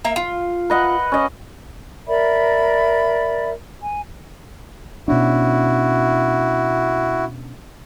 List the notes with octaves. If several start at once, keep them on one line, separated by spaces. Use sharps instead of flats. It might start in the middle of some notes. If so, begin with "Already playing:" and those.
A#3 E5 A#5
F4
B4 D#5 F#5
C#4 D#5
A#4 D5 E5 B5
G#5
B2 C#4 D4 E4 F#4